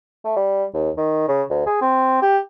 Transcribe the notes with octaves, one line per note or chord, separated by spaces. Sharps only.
A3
G3
D#2
D#3
C#3
D2
G#4
C4
G4